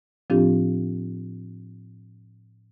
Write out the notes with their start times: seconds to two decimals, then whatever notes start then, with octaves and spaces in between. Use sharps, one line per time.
0.30 A2 F3 C4 D4 F4 G4